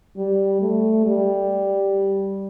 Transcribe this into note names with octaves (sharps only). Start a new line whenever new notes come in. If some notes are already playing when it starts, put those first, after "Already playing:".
G3
A3
G3